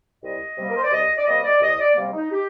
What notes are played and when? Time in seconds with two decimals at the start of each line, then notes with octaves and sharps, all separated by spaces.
0.23 C2 D#5
0.57 C3 G3 A#3
0.69 A#4
0.77 C5
0.84 D5
0.92 C2 D#5
1.18 D5
1.27 C3 G3 A#3 D#5
1.44 D5
1.60 C2 D#5
1.79 D5
1.96 C3 G3 A#3
2.13 D#4
2.30 G4